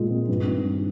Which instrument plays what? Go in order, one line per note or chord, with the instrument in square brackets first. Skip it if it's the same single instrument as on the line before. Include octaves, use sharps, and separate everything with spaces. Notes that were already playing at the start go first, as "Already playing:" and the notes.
Already playing: [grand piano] A#2 G#3 F4
C4
G2
D#3
G2